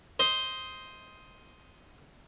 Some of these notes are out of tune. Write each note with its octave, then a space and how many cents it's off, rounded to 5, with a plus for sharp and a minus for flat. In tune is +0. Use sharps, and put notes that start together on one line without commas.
C5 +0 D#5 +15